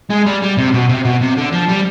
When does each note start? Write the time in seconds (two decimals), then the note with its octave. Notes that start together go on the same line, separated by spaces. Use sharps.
0.10 G#3
0.26 G3
0.42 G3
0.57 C3
0.74 B2
0.89 C3
1.05 B2
1.22 C3
1.37 D3
1.53 F3
1.69 G3